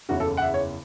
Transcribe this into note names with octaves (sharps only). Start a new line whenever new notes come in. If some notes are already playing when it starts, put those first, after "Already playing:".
F#1 E2 C#3 F#4
A4
F#5
E5
C#5